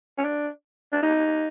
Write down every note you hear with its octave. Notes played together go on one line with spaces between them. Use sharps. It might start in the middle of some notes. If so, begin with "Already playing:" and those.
C#4
D4
D4
D#4